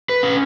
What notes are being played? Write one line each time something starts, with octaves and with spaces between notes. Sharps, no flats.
B4
C#4